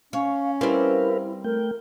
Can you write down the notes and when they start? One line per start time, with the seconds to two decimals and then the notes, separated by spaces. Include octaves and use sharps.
0.13 C#4 C#5 F5
0.61 G3 C4 E4 A#4 B4 F5
1.44 A3 A#4 G5